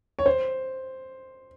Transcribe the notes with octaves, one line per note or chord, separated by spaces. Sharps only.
C#5
C5